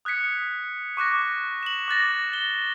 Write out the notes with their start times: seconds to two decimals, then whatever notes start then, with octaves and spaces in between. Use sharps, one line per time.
0.05 D#6 F#6 G#6 B6 C#7
0.97 C#6 D6 F#6 A#6
1.63 E7 F#7
1.88 D6 F#6 A6 A#6
2.33 G7